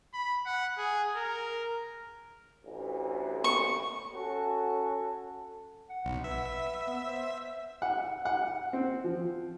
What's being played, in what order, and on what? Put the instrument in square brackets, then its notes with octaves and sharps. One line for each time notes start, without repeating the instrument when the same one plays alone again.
[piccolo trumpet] B5
F#5
G#4
A#4
[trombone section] A1 D2
[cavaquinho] C#6
[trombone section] C#4 F#4 A4
[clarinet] F#5
[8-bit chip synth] B1
[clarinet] B4 [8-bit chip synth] E5
[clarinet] B3
C5
[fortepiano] F#5
F#5
C4
F3